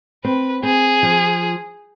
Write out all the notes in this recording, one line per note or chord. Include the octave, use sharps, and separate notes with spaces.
C4 B4
C4 G#4
F3